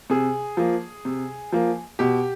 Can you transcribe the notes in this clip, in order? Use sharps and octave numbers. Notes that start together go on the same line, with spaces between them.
C3 G#4
F3 A#3
C3
F3 A#3
B2 G4